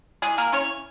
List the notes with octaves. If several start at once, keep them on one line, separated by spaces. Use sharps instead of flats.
E3 G#3 G#4
A#3 A#4
E3 C#4 C#5